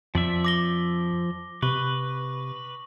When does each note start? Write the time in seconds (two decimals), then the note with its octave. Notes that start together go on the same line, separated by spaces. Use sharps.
0.15 F2 F3 D5 E5
0.45 D6 A#6 G7
1.62 C3 B4 C#6